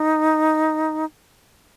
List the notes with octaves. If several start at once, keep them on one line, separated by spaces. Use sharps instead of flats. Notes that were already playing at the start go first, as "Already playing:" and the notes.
Already playing: D#4